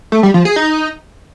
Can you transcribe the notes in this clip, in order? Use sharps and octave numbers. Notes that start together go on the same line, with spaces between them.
A3
G3
F3
G#4
D#4